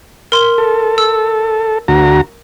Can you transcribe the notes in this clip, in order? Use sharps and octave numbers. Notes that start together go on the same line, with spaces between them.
A#4 C6
A4
E6
D2 F#4 A#5